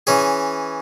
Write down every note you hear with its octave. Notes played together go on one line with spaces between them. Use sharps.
E3 C#4 G#4